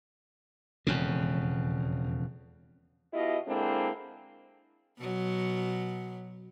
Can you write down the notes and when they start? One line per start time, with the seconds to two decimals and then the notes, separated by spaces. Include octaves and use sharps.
0.87 E1 F2 C#3
3.13 B2 E4 F4 G4 D#5
3.47 D3 G#3 A#3 C4 D4 E4
4.98 B2 F#3